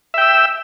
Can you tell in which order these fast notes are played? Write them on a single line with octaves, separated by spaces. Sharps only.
E5 G5 E6